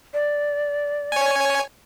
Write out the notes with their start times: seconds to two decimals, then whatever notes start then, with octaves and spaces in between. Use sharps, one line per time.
0.14 D5
1.12 C#5 G#5